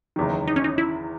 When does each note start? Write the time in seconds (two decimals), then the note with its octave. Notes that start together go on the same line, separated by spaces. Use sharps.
0.16 F#1 E2 D#3
0.48 D#4
0.56 C#4
0.64 D#4
0.78 E4